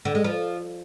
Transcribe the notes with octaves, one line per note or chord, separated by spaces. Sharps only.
D3
G#3
F3